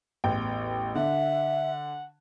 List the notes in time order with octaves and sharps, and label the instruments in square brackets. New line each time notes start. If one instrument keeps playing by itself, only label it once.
[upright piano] A1 E2 G5
[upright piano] D3 [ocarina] E5 [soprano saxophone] F#5